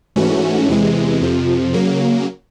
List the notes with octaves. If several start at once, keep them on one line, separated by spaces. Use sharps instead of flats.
G#2 E3 A3 C#4 F#4
E2 C3 E3 G#3
F2 C3 F3
C#3 F#3 A#3